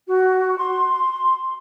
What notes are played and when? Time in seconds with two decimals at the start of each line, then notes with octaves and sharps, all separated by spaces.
0.07 F#4
0.58 C6